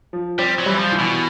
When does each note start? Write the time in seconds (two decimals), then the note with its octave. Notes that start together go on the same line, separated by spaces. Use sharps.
0.13 F3
0.39 G3 C4
0.59 F#3
0.66 E3 G3
0.79 F3
0.92 E3
0.99 B2